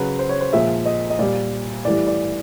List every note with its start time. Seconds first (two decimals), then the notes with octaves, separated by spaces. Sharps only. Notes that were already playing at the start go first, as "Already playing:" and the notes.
Already playing: C#3 F#3 B4
0.19 C5
0.29 C#5
0.41 C5
0.53 A#2 F3 G#3 E5
0.86 D#5
1.10 D#5
1.19 A#2 G3 D5
1.85 A2 E3 G3 D5
2.07 D5